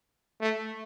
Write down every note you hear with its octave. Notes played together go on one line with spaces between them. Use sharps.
A3